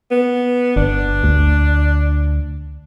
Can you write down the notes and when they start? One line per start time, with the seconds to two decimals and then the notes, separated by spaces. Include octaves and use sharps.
0.11 B3
0.76 G1 D4
1.24 D2